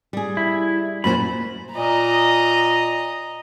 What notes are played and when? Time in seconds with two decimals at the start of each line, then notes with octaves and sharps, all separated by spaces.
0.13 G3 G#4
0.37 E4
1.04 F#2 A#2 C5 B5
1.74 A#2 D#5 A#5